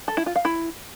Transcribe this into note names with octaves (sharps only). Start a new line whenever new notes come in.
A4
E4
F4
F5
E4